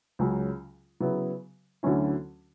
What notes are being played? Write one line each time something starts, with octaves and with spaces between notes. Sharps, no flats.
C#2 C#3 F#3 C#4
C#3 F#3 B3 E4
D2 D3 F#3 C#4 E4